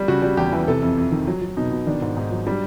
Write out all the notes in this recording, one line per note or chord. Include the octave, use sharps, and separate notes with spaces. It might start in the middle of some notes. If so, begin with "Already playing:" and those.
Already playing: G3
C#3 F#4
G3
E2 G4
E3
C3 A4
F2
F2
D#3
F#3
F#3
B2 D#4
B2
D#3 D4
G#2
G#2 D#4
F#3
G3 D4